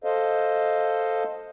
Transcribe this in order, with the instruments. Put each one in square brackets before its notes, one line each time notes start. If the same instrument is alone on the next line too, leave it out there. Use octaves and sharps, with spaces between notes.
[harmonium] A4 C5 D#5 F5